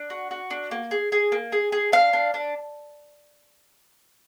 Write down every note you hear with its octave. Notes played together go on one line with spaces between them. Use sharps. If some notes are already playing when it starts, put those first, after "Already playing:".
Already playing: D4
F#4
F#4
D4
A#3
G#4
G#4
A#3
G#4
G#4
D4 F5
D4
D4